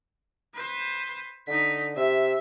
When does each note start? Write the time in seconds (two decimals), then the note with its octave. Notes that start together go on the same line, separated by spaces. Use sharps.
0.55 B4 C5
1.48 D3 D#4 B6
1.96 C3 E5